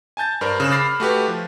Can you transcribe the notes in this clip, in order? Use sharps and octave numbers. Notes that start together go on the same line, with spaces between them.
G#5 A5 G6 A6
G2 A#4 C5 D5
C#3 F#6 E7
B5 D6 F6 A6 A#6 C7
A3 F#4 G4 B4
F3